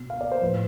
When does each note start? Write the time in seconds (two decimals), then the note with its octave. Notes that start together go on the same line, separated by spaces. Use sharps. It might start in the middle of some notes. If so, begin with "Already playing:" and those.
Already playing: B2
0.10 F5
0.21 D5
0.32 C5
0.41 A2 F3 B4